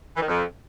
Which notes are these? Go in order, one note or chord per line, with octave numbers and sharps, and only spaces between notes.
E3
D#3
F2